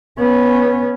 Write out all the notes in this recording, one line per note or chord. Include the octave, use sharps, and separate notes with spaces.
B3 C#4